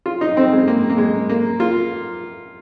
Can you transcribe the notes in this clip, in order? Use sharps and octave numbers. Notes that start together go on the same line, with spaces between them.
F4
D#4
C4
G#3
A#3
A#3
G#3
A#3
F4